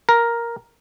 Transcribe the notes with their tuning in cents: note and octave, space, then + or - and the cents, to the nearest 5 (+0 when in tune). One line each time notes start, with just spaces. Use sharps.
A#4 +5